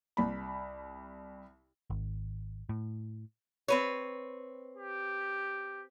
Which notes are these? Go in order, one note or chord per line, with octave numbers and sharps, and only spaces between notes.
C2 B5
G#1
A2
C4 B4 C#5
G4